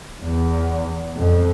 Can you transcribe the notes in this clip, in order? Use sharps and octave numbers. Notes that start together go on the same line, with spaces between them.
E2
F2